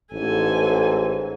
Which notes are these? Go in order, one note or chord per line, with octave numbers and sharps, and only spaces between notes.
A1 G#2 A4 G#5